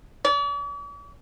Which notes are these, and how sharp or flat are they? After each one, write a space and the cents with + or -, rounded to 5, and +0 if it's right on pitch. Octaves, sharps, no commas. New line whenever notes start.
D5 -45